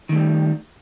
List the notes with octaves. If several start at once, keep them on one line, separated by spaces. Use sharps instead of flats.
D#3 G3 A3